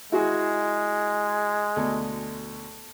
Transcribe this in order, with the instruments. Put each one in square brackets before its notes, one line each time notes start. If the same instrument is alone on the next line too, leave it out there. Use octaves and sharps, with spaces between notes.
[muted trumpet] G#3 [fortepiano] E4 F#4 G#4
[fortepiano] D2 B2